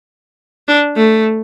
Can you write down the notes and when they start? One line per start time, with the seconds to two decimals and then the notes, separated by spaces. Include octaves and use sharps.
0.68 D4
0.96 A3